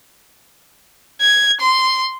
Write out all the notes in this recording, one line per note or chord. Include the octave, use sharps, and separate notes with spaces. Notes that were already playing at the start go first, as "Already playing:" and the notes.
G#6
C6